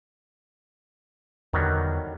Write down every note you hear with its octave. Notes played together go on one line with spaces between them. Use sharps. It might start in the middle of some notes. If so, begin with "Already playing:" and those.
E2 D3 D#3 F#3 G3